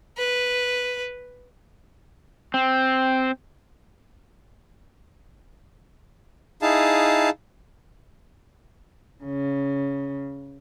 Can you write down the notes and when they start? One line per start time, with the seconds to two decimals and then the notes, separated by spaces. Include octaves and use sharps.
0.18 B4
2.54 C4
6.62 D#4 E4 G#4 F5 A5
9.24 C#3